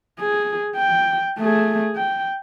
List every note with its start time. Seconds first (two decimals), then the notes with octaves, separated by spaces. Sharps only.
0.20 G#4
0.76 G5
1.39 A3 G#4
1.96 G5